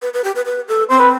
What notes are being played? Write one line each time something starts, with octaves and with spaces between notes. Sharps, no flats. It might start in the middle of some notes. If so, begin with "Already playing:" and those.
B4
B4
G4
B4
B4
A4
C4 C5
B4